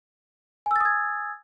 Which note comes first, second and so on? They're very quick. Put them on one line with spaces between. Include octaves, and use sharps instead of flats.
G#5 E6 A6 D#6 G#6